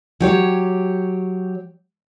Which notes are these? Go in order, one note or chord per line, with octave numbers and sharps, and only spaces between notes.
F#3 G4 C#5